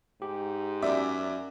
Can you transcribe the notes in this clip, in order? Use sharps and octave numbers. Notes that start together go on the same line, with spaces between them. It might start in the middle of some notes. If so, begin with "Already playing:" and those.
G#2 G4
F#2 D5 E5 D6